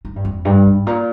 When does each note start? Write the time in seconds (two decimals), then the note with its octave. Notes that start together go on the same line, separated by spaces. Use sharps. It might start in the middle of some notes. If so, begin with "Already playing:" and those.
0.05 D#3
0.16 G2
0.25 F2
0.45 G2
0.66 G#2
0.87 A#2